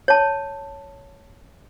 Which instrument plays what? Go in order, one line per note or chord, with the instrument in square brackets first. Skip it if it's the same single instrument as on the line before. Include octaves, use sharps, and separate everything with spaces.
[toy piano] C#5 A5